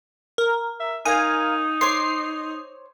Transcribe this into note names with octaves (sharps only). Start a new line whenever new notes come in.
A#4
E5
D#4 A#4 F5 G#5
C5 C#5 D6 C7